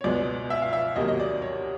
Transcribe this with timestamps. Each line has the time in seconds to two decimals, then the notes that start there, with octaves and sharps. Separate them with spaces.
0.01 C#5
0.04 C#2 B2 G#3 B3 D5
0.50 E5
0.62 F5
0.73 E5
0.96 D2 C3 D#3 F#3 A#3 D#5
1.08 D#5
1.20 D5
1.42 C#5